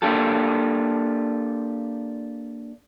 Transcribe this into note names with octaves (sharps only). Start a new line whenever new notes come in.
A#3 D4 F4 G4 A4